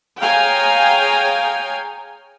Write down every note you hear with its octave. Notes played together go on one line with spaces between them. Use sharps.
G#4 C#5 F5 G5 G#5 A#5